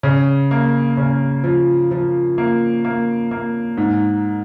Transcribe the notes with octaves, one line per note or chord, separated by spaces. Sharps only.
C#3
A#3
C#3
F3
F3
A#3
A#3
A#3
G#2